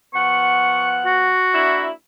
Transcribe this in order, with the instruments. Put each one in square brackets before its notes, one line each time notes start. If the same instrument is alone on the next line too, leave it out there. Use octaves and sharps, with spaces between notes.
[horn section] F3 B3 F#5 [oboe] C#6
[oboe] F#4
[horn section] A#3 D4 E4